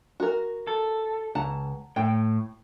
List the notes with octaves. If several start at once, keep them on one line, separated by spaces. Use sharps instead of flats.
F#4 A#4
A4
C#2 F#5 A5 A#5
A2 G5